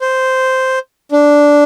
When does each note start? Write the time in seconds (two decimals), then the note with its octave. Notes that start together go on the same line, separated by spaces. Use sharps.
0.01 C5
1.12 D4